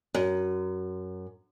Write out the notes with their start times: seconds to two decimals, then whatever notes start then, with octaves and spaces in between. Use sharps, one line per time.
0.14 F#2